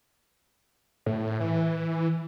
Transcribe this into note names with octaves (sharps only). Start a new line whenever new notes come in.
A2
E3